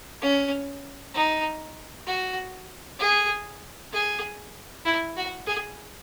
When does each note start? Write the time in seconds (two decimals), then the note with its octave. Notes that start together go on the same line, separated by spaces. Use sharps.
0.22 C#4
1.14 D#4
2.07 F#4
2.99 G#4
3.92 G#4
4.85 E4
5.16 F#4
5.47 G#4